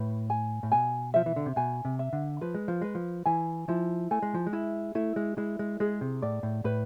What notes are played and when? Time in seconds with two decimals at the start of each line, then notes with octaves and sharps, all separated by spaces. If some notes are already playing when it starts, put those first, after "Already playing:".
Already playing: A2 B4
0.30 G#5
0.63 A2
0.72 B2 G#5
1.14 F3 E5
1.26 E3
1.36 D3
1.46 C3
1.56 B2 G#5
1.85 C3
1.99 E5
2.13 D3
2.41 F3 B4
2.55 G#3
2.68 F3
2.82 G#3 B4
2.95 F3
3.26 E3 G#5
3.68 F3 E4
4.11 A3 G#5
4.23 G#3
4.34 F3
4.47 G#3
4.53 E4
4.95 A3 E4
5.16 G#3
5.37 G#3 E4
5.59 G#3
5.80 G#3 G#4
6.01 C3
6.22 A2 D5
6.43 A2
6.64 A2 B4